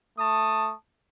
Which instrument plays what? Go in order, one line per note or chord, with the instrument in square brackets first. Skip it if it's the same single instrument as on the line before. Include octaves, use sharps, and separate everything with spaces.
[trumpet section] A3 A5 C#6 D#6